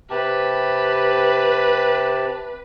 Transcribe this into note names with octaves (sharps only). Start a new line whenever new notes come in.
C3 G4 B4 A5